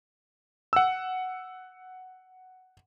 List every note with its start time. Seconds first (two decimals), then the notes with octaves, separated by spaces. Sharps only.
0.73 F#5 E6